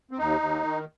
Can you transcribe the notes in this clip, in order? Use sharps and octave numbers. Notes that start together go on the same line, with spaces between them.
C4
D#2 D#4
D#2
D#3